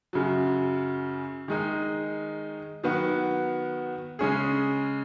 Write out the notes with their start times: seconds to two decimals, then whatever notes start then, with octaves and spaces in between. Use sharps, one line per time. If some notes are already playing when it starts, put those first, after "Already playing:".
0.13 F#2 C#3 F#3
1.48 D#3 G#3 D#4
2.83 D#3 F#3 B3 F#4
4.19 C#3 G#3 C#4 G#4